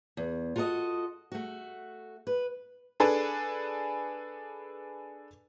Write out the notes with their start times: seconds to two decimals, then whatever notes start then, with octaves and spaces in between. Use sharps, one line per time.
0.17 E2
0.56 F4 F#4 A4 D5 D#5
1.32 A3 F#4
2.27 B4
3.00 D4 G#4 A4 B4